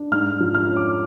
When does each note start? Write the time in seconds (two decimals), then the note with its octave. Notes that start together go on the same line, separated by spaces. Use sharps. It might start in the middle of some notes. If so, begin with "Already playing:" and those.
Already playing: D4
0.12 G#2 F6
0.40 F3
0.54 F6
0.69 C#4
0.76 D6